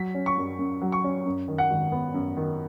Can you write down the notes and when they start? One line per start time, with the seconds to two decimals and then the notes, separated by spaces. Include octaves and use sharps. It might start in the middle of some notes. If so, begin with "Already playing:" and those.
Already playing: F#3 B6
0.14 C#4
0.26 C#6
0.38 F#2
0.59 F#2
0.81 F#3
0.92 C#6
1.04 C#4
1.26 F#2
1.48 D#3
1.58 F#5
1.70 G#1
1.92 B3
2.14 F#2
2.37 D#3